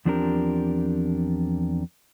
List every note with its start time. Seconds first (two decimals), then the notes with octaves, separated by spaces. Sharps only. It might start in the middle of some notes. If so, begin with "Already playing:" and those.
0.05 E2 F3 C4 D4 G4 A#4